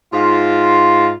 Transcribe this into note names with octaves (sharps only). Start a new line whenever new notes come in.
G#2 F4